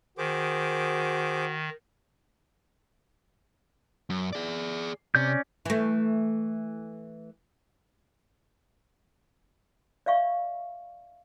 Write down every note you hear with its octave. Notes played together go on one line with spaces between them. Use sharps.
D#3 F#4 G#4 C5 D6
F#2
G#4 D5
C3 C#4 D5 G6
E3 A3
D5 E5 F5 C#6